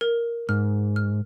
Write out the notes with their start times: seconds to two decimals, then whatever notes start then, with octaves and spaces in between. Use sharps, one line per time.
0.01 A#4
0.49 G#2 F6
0.96 F6